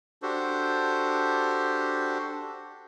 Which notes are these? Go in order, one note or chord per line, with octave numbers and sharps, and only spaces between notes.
D4 F#4 G4 A4 C5